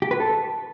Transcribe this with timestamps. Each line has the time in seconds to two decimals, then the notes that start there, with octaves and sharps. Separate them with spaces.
0.02 G4
0.11 B4
0.20 A4